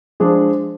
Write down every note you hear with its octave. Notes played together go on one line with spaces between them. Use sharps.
F3 G#3 D4 G#4